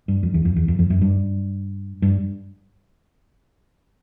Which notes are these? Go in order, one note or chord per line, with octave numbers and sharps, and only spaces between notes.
G2
F2
E2
F2
E2
F2
F2
F#2
G2
G2